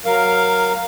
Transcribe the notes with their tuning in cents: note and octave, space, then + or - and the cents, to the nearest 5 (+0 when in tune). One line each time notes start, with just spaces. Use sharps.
F#3 +0 A#4 +5 F5 +0